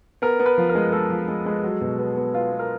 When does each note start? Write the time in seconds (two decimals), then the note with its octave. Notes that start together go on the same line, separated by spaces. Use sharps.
0.22 B3 A#4
0.40 B3
0.46 B4
0.58 F3
0.69 A#4
0.75 G#3
0.93 G#3 A4
1.10 F3
1.28 G#3
1.46 G#3
1.64 F#3
1.81 B2
1.99 B3
2.17 B3
2.34 B3 F4
2.52 B3
2.59 A#4